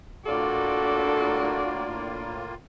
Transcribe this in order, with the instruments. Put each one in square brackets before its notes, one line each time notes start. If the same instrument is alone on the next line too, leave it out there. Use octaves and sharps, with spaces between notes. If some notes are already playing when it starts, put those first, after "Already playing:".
[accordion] A2 A#3 F4 [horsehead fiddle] D4 D5 [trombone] F#4 [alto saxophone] A4